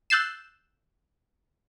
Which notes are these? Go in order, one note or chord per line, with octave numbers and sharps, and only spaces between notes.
E6 F#6 G6 A6 C7 E7